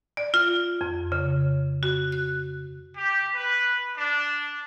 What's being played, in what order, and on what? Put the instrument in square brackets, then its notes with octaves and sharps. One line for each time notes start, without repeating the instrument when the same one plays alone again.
[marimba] D5
F4
F2
C#3
F#4
F#6
[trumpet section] G4
B4
D4